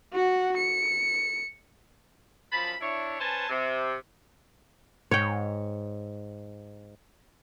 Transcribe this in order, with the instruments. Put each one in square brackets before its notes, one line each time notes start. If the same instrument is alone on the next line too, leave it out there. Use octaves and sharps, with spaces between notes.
[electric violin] F#4 F#5
C#7
[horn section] F#2 F3 A5 B5
D4 E4 C#5
C#4 B4 C5 G#5 A5
C3
[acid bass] G#2 [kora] C#5 G5